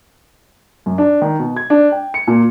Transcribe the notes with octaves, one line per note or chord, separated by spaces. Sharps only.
F#2
D4
D#3
B2
G#6
D4
G5
C#7
A#2